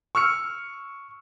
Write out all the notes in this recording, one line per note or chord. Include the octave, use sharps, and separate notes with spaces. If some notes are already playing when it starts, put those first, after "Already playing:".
C#6 E6 F6 C#7